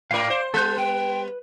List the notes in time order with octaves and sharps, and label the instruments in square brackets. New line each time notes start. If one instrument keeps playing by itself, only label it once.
[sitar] G#2 A#4 [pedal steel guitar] D5 F5
[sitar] C5
[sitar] G3 B3 [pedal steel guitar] A4 G6
[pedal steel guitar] B4 [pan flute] G5